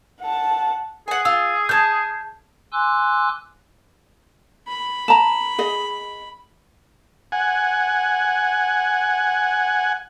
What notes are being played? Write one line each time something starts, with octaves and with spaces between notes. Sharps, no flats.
F#5 A5
G#4 F#5 G#5
F4 E6
A5 F6 G6 G#6
G#5 C6 D6 E6 F#6
B5
A5 A#5
G#4 D#5
F#5 G#5